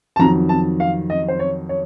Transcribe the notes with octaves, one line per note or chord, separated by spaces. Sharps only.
A5
F2 D#3 F#3 A#5
A5
F5
D#5
C5
C#5
C#5